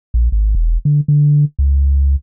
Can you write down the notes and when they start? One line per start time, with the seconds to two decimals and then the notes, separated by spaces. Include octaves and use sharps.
0.14 A#1
0.32 G#1
0.55 E1
0.85 D3
1.08 D3
1.59 C#2